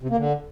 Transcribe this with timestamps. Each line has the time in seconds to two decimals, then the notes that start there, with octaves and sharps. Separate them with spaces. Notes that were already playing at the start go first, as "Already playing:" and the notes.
0.03 C3
0.10 A#3
0.18 D3